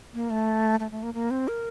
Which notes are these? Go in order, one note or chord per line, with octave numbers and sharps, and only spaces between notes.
A#3
A3
A3
A3
A#3
A#3
C4
A#4